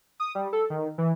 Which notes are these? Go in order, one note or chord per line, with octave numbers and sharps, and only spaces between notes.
D#6
G3
A4
D#3
E3